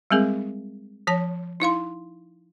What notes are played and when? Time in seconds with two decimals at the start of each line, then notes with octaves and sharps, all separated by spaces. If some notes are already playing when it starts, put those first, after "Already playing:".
0.10 G3 G#3 C4 G#4 A#4
1.07 F3 C#5 A5
1.60 D#4 E4 F5 C6